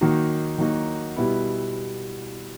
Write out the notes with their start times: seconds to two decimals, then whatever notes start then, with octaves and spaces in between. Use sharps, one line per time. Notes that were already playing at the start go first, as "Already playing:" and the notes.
0.01 D#3 F#3 A#3 D#4 F#4
0.58 D#3 F#3 A#3 D#4 F#4
1.16 B2 G3 B3 E4